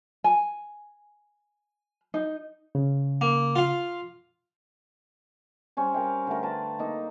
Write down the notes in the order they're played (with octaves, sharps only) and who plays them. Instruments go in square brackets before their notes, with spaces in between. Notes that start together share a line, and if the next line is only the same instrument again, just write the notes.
[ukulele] G#5
D#4
[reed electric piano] C#3
[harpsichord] A#3
F4 F5
[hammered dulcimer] G3 C#4 C5
A#4 F5 G5
D3 A3 A#4
B4 A5
A#3 D#4